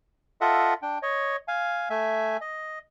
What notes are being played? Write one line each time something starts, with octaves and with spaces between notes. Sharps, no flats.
F4 A4 D#5 E5 F#5
D4 G5
C#5 D#5
F5 G#5
A3 E5 G#5
D#5